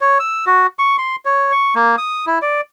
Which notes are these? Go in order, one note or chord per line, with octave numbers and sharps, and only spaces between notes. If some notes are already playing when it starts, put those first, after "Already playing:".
C#5
E6
F#4
C#6
C6
C#5
C#6
A#3
D#6
E4
D5